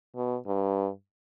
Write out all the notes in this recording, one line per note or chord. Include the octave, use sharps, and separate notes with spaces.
B2
G2